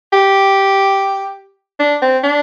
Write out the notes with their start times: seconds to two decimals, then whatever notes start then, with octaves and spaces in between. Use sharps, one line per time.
0.13 G4
1.80 D4
2.02 C4
2.23 D4